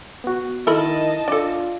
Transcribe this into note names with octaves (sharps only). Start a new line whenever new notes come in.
B3 F#4
D#3 E4 A4 A#4 D#5 A5 B5
D4 F4 A4 D5